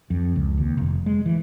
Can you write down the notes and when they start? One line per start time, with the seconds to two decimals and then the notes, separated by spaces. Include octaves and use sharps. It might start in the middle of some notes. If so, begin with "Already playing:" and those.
0.10 F2
0.36 C#2
0.58 D#2
0.77 F1
1.06 G#3
1.26 E3